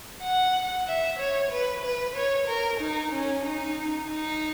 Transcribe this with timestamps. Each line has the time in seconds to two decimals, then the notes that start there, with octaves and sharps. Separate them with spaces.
0.22 F#5
0.87 E5
1.19 C#5
1.51 B4
1.84 B4
2.16 C#5
2.48 A#4
2.80 D#4
3.12 C#4
3.45 D#4
4.09 D#4